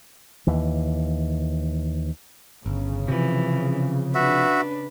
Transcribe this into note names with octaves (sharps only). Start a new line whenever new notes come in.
D#2 E3
G1 C#3
C3 E3 F3
D4 F#4 B4 E5